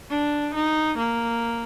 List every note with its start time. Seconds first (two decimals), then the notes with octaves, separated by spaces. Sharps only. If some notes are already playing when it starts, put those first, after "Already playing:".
0.10 D4
0.54 D#4
0.98 A#3